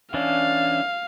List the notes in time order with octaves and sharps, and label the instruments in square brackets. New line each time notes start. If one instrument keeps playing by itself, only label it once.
[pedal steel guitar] E3 C#4 D4 [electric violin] F5